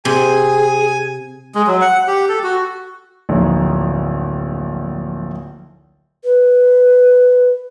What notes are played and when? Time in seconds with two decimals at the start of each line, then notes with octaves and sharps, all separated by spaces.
0.05 C3 G#4 G#5
1.55 G#3
1.67 F#3
1.81 F#5
2.08 G4
2.29 A4
2.43 F#4
3.29 D1 A#1 D#4
6.24 B4